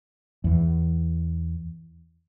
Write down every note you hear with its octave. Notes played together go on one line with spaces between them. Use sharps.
E2 E3